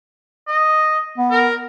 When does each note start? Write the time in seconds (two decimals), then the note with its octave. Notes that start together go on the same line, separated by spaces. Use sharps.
0.48 D#5
1.18 B3
1.31 A#4